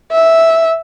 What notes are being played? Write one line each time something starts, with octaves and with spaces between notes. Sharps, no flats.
E5